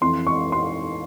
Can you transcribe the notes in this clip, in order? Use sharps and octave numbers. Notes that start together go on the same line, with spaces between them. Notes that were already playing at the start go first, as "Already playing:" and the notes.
F2 E3 C6
C#6
C6